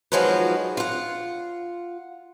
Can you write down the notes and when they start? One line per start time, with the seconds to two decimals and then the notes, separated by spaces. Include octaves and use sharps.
0.12 D#3 F3 F#3 G#3 F4 B4
0.77 F4 F#5